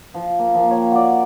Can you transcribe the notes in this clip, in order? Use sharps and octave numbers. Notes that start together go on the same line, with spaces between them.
F3
A#3
F3 A#3
C#5 G5
F#4 D5